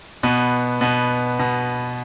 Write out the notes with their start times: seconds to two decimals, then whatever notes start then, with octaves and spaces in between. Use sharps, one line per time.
0.23 B2 B3
0.81 B2 B3
1.39 B2